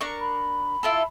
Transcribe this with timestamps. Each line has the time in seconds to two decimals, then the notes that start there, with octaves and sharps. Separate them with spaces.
0.01 D4 A#4 C#6
0.20 B5
0.83 E4 F4 A4